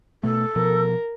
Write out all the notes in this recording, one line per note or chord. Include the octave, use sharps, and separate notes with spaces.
B2 A3 A4
B2 F3 A#4